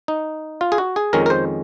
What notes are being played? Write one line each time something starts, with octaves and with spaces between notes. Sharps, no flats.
D#4
F4
G#4
F#4
G#4
F2 D#3 G#3 C#4 A#4
A#4
C5